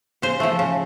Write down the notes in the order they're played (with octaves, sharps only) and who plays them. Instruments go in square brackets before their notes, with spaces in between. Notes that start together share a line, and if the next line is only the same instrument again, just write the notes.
[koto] C#3 C5
F3 A3
C#3